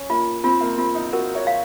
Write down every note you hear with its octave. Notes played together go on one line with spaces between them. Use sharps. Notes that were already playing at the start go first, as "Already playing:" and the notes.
Already playing: C#4
A#3 F4
C4 F4
A#3
C4 F4
D#4
F#4 A#4
C#5
F5